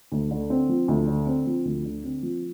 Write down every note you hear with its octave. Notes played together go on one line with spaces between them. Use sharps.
D2
D3
C4
F3
D2
D3
C4
F3
D2
D3
C4
F3